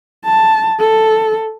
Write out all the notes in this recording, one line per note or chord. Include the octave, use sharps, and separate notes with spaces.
A5
A4